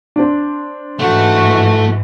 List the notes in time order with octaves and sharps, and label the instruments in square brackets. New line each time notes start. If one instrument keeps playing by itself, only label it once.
[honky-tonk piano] C4 D4
[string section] G#2 E3 [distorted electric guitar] A3 [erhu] F#4